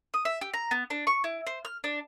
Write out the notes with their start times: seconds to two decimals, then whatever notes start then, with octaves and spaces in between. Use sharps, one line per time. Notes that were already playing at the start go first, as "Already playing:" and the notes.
0.14 D#6
0.25 E5
0.41 G4
0.54 A#5
0.71 B3
0.90 D4
1.07 C#6
1.24 E4
1.47 C5
1.65 F6
1.84 D4